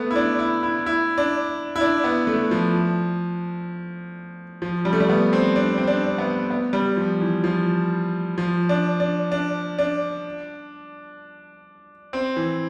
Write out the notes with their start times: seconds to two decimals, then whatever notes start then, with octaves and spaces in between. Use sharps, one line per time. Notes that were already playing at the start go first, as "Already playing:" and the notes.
Already playing: A3 B3
0.11 E4
0.16 D4
0.39 E4
0.63 E4
0.86 E4
1.18 D4
1.76 E4
1.81 D4
2.04 B3
2.27 A3
2.51 F3
4.62 F3
4.85 G3
4.93 A3
5.00 G3
5.09 B3
5.33 C4
5.56 D4
5.78 C4
5.88 D4
6.18 B3
6.50 B3
6.73 G3
6.97 F3
7.21 E3
7.44 F3
8.38 F3
8.69 D4
9.00 D4
9.32 D4
9.79 D4
12.13 C4
12.37 E3